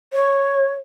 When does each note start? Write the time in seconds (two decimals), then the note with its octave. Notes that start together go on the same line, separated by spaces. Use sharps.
0.13 C#5